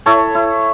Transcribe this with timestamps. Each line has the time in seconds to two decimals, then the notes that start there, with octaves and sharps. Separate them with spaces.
0.06 E4 A4 C#5
0.35 E4